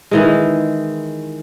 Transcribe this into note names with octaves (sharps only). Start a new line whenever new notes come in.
D#3 E3 G#3